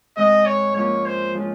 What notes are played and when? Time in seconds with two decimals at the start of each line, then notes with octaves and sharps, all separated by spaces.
0.16 G#2 D#3 G#3 C4 D#5
0.46 C#5
0.74 G#2 F3 A#3 C#4 F4 C#5
1.06 C5
1.35 F3 G#3 C#4 F4